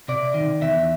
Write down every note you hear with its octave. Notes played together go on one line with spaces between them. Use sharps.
C3 D5
D#3
E2 E5